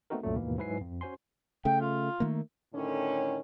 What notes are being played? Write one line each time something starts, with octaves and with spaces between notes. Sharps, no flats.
A3 B3 C4 D#4 F#4 A#4
C2 F#2 A#2 F#3 A3
D#2 G#2 B2 E3 A#3
G#2 F#3 E4 B4 G#5 C7
F2
C#4 F#4 C5 G#5 C6
C#3 A3 G5
F4
D#3 A3 A#3
A2 D3 D#3 C#4